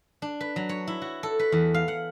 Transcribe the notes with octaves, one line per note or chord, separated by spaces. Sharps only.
D4
B4
F#3
C#5
E4
F#4
A4
B4
E2
F5
F#5